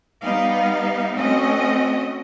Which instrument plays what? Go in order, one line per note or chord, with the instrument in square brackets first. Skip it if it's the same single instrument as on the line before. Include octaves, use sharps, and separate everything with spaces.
[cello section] G3 B3 D#4 F5
A3 C4 C#4 F#4 D#5